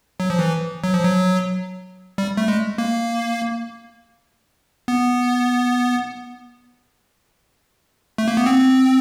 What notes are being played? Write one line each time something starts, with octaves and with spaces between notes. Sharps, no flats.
F#3
F3
E3
F#3
F3
F#3
G3
A3
G#3
A#3
B3
A3
A#3
B3
C4